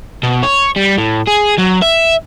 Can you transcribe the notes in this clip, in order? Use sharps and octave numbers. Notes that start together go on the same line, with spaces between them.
B2
C#5
G3
A2
G#4
F#3
E5